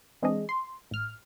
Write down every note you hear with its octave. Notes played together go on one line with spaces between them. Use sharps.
E3 G#3 C4 D4 G#4 D#5
C6
A1 F6